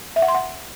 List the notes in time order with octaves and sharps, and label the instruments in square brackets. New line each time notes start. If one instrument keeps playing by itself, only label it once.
[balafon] E5
F#5
C6
F#5